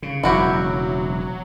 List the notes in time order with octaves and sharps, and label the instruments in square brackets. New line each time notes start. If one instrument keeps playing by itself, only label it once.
[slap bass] C#3
[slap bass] E1 C#3 [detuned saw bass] F#3 [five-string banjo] E4 F#4 G4